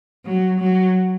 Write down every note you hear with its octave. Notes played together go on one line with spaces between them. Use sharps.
F#3
F#3